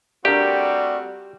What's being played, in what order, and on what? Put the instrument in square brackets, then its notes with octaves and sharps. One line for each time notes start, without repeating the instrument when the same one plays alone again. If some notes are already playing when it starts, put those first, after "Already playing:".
[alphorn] G3 [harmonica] A3 C4 F#4 [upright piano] D4 A#4 [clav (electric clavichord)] G4